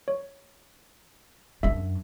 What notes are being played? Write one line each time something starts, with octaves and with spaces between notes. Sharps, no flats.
C#5
F#2 D4 E5